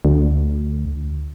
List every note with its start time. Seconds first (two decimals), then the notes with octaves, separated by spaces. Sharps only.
0.05 D2